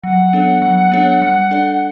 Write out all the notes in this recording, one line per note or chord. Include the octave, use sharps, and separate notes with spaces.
F#3 F#5
B3 D4 A4 C#5
F#3
B3 D4 A4 C#5
G3
D4 A4 D5